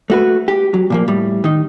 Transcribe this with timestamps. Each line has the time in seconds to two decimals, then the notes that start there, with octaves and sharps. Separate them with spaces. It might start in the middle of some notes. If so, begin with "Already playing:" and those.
0.10 A3 F#4 B4
0.48 G4
0.74 F#3
0.90 A#2 F3 A#3
1.08 A2 G3
1.44 D#3 D#4